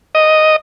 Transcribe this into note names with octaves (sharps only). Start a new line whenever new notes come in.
D#5